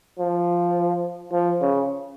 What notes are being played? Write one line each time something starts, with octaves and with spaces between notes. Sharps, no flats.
F3
F3
C#3